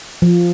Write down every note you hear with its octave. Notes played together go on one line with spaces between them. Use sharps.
F3